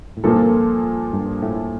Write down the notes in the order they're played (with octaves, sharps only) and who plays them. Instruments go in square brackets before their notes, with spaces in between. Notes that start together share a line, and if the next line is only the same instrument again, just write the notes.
[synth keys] A2
[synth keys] G2 [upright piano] A#2 F3 A#3 F4 A4
[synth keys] G2
A2